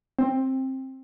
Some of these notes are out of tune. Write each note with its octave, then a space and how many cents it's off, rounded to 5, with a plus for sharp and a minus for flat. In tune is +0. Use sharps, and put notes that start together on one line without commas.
C4 +15